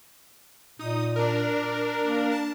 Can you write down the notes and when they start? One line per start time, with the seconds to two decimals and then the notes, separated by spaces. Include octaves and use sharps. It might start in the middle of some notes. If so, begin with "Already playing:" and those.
0.79 A#2 D#4 D#6
1.16 D4 A#4
2.03 A#3
2.32 A5